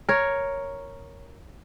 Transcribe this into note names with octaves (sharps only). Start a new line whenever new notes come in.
A#4 C#5